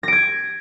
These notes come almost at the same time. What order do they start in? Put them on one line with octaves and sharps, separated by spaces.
A#6 D7 G#6